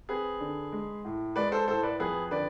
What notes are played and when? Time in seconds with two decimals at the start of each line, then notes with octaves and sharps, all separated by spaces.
0.09 C4 G#4 B4
0.40 D3
0.72 G#3
1.05 A2
1.36 G#3 B4 D5
1.52 A4 C5
1.68 A2 A4 C5
1.83 B4 D5
2.00 F2 G#4 B4
2.31 D3 B4 D5